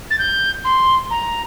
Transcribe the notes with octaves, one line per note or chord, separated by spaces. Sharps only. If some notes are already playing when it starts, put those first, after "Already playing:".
A6
G6
C6
A#5